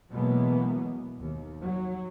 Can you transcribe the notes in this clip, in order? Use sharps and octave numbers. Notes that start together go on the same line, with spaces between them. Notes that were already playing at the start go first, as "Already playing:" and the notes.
B2 E3 F#3 G#3 A#3 B3
D#2
F#3